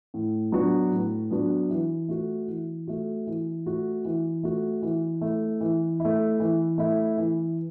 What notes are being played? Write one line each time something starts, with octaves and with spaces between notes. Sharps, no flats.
A2
F#3 B3 D4 F#4
A2
F#3 B3 D4 F#4
E3
A3 F#4
E3
A3 F#4
E3
A3 F#4
E3
A3 F#4
E3
A3 E4
E3
A3 E4
E3
A3 E4
E3